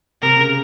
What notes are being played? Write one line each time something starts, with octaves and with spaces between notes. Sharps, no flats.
C3 A#4
C#3